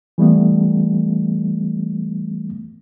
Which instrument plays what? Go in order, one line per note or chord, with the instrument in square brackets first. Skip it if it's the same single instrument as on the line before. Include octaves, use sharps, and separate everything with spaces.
[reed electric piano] E3 G3 A3 B3